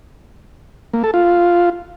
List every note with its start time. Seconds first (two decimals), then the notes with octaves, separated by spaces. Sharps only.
0.94 A#3
1.04 A4
1.14 F4